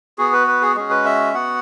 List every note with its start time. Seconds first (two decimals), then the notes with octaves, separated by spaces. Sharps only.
0.18 B3 F#4 G#4
0.33 B4
0.47 B4
0.62 G#4
0.75 G#3 C#4 F#4 G#4
0.90 B4
1.05 E5
1.34 B3 F#4 F#5